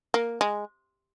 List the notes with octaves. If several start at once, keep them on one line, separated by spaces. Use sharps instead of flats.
A#3
G#3